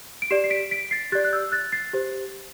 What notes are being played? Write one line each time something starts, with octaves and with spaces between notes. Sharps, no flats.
D7
G4 D5 C7 E7
C7
B6 D7
B6 D7
A6 C7
G4 D5 F#6 A6
F#6
E6 G6
F#6 A6
A6 C7
G4 C5